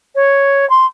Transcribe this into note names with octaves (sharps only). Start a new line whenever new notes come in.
C#5
C6